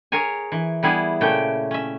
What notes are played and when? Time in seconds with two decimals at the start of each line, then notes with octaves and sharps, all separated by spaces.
0.12 G#4 A#4 C#5 G#5
0.52 E3
0.83 G3 B3 E4 G#4
1.21 A#2 C#3 A3 G5
1.71 C#4 E5